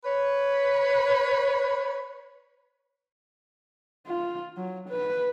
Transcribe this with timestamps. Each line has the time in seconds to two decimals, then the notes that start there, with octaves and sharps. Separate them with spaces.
0.04 B4 C#5
4.07 F4
4.57 F#3
4.90 B4